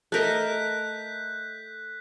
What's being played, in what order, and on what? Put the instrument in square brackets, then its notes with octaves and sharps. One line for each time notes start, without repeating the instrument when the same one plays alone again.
[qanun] A3 A#4 D#5 [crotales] F#6 G6 B6